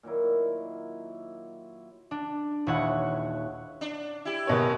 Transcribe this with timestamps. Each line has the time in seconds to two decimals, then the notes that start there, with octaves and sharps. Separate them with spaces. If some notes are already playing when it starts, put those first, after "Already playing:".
0.03 A#2 D#3 F#3 E4
2.11 D4
2.67 D#1 E4 C#5 F#5
3.81 D4
4.25 E4 G4
4.47 F#1 B2 C#5